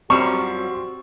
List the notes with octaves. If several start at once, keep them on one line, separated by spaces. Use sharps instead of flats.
F#2 F3 G3 C4 F#4 C#6